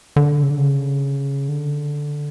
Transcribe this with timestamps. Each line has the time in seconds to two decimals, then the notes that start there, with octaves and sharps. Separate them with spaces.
0.16 D3
0.43 C#3
0.51 D3
0.57 C#3
1.49 D3